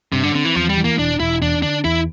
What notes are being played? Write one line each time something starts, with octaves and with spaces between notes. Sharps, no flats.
G2 C3
D3
D3 C4
E3
E2 F3
G3
E3
A#3
E1 D4
E1 E4
E2 D4
D3 D4
E2 E4